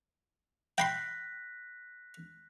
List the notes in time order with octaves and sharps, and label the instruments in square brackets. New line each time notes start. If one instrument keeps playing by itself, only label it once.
[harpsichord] G5 B5 C6 [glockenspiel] F#6 A#6 B6